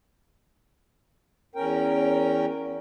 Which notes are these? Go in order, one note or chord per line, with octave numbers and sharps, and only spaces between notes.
E2 C#4 A#4 G5